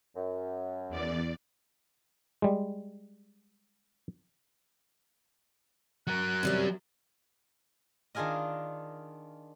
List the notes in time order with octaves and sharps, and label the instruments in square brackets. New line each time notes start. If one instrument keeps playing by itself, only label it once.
[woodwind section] F#2
[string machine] E2 D5
[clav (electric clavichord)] G3 G#3
[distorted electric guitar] F#3 A#4 [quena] F#6
[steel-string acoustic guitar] C3 G3 C#4
[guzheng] D#3 D4 F4 G#4 A#4 D#5